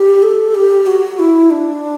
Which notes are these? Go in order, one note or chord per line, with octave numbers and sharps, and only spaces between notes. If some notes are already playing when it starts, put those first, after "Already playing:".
Already playing: G4
A4
G4
F#4
E4
D4